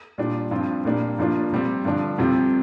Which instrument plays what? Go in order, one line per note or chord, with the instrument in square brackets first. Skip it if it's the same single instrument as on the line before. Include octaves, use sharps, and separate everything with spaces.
[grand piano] A#2 G3 D4 F4
G2 F3 C4 F4
A#2 G3 A#3 D4
G2 F3 A#3 D4 F4
C3 G3 C4
G2 D3 F3 D4
F2 C3 G3 C4 F4